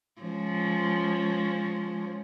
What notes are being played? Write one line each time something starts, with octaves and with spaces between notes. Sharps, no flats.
F3 G#3 C#4